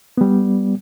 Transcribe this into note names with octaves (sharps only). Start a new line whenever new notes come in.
G3 B3